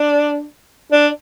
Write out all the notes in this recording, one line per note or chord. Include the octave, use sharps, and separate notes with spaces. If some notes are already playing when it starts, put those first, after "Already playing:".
Already playing: D4
D4